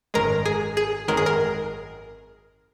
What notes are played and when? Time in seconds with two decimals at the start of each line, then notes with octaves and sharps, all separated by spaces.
0.14 G#1 F#2 D#3 G#3 A#4
0.45 G#4
0.77 G#4
1.08 G#1 F#2 D#3 G#3 A#4
1.17 G#4
1.26 A#4